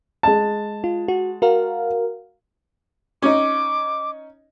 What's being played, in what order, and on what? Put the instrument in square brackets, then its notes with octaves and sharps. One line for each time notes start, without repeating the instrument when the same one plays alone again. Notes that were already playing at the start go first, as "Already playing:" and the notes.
[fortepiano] G#3 A5
[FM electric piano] F4
F#4
F#4 A#4 F5
[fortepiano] C#4 D#4 [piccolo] D6